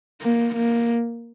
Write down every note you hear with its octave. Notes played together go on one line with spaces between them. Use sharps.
A#3
A#3